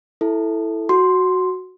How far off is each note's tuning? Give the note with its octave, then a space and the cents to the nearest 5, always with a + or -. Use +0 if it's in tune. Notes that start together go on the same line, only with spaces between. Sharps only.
E4 +0 A4 +0
F#4 +0 C6 +0